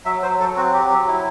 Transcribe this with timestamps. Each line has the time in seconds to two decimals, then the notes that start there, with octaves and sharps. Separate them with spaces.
0.05 F#3 E5
0.22 F#3 C5
0.40 F#3 A4
0.56 C4 F#4
0.73 F#3 G4
0.91 F#3
1.08 E4